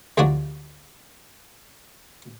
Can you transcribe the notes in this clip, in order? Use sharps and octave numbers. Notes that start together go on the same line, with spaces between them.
D2 C3 F3 F#3 D4 F#4